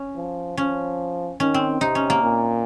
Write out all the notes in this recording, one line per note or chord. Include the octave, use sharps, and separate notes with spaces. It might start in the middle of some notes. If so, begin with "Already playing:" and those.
Already playing: C#4
F3
F3 C#4
D#3 C#4
C4
C3 D#4
C#4
A#3
A#2